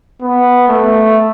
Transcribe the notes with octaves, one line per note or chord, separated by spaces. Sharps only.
B3
A3